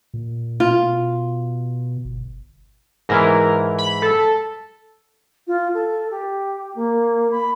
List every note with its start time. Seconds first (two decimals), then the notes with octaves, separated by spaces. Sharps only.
0.14 A#2
0.60 B2 F4
2.05 G1
3.09 G#2 E3 E4 A#4
3.78 B5
4.02 A4
5.47 F4
5.74 A4
6.11 G4
6.75 A#3
7.31 B5